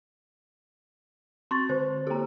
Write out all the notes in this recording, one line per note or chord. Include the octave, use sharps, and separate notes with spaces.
C4 C6 C#6 A6
D3 C5
A#3 G4 A4 A#5